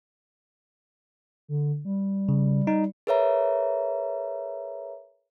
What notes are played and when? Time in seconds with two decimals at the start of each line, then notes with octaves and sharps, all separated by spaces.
1.49 D3
1.85 G3
2.29 C#3
2.67 D#4
3.07 G#4 A#4 B4 C#5 E5 A#5